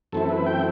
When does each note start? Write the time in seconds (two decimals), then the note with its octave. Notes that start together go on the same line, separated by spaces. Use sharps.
0.12 F#2 E3 A3 C4 E4 A4
0.29 B4
0.46 G5